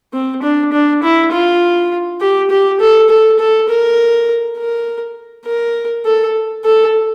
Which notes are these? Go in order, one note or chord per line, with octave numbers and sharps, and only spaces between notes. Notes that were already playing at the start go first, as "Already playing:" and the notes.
C4
D4
D4
E4
F4
G4
G4
A4
A4
A4
A#4
A#4
A#4
A4
A4